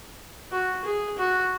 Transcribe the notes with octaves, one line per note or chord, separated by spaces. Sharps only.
F#4
G#4
F#4